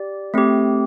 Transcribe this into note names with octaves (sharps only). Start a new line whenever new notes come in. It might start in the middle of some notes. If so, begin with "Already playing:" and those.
Already playing: G4 D5
A3 C4 G4